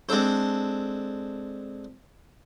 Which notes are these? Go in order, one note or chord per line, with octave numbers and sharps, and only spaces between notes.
G#3 C4 D4 A4 C5